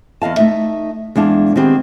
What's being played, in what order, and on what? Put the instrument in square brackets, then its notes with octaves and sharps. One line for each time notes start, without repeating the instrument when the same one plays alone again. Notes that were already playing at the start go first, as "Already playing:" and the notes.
[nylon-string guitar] E2 D#5 F5 A5
A3 D#4 E5
E2 G#3 D4 F5 A5
D#3 B3 C4 G4 G#4